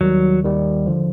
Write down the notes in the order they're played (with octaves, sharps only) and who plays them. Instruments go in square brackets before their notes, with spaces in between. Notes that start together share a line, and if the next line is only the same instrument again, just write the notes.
[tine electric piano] D#2 D#3 G3 [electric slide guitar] F#3
[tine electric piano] D#2 D#3 G3
D3 F3